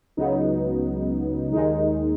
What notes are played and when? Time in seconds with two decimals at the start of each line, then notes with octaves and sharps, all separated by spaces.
0.17 C#2 C#3 F#3 B3 D#4
1.52 D#2 D#3 G#3 D#4